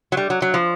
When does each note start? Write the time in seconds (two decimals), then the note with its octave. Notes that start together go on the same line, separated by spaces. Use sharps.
0.12 F#3
0.17 G3
0.30 F#3
0.42 F#3
0.54 F3